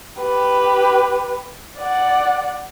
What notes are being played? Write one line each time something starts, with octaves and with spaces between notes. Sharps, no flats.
G4 B4
D5 F#5